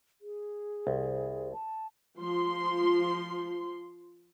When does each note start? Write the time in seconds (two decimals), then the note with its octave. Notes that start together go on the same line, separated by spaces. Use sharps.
0.21 G#4
0.87 C2
1.53 A5
2.18 F3 C6